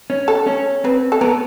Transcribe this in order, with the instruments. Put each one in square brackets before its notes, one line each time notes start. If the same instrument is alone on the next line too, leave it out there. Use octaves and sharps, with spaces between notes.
[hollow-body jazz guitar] C#4
[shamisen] A4
[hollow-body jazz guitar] C#4
[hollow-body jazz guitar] C4 [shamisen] B4
[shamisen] A4
[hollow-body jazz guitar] B3 [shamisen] A#4